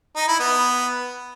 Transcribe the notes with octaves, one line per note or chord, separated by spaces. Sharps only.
D#4
E4
B3